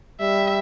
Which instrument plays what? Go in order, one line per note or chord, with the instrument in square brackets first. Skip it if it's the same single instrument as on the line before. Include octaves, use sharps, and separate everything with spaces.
[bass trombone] G3 [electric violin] E5